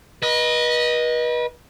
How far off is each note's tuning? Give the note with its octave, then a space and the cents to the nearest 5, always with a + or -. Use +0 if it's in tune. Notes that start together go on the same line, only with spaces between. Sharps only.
B4 -35 D#5 +0